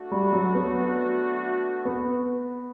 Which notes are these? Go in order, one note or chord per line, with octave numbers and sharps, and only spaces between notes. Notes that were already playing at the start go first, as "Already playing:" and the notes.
Already playing: A3 D4 F#4
G3
F#3
B3
B3